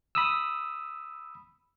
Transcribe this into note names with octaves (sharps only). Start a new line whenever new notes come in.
B5 D#6 E6